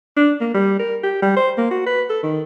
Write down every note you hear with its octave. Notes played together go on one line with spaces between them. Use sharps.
D4
A#3
G3
A#4
G4
G3
C5
A#3
F#4
B4
A4
D#3